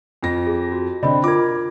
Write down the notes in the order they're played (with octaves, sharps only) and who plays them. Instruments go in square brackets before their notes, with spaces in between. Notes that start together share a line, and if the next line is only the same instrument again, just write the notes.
[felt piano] F2 A#6
[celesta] G#4
F#4
[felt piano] D3 C4 [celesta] D5 D#5 B5
[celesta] F4 G#6 [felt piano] A#4 D6